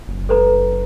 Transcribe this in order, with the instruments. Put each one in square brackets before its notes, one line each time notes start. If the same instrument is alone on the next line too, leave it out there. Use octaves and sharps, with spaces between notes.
[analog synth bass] F#1
[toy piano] A4 B4 A#5